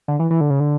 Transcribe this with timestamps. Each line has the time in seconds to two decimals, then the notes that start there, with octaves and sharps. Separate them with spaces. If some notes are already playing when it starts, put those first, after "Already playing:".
0.08 D3
0.19 E3
0.30 E3
0.41 D3
0.50 C#3
0.60 D3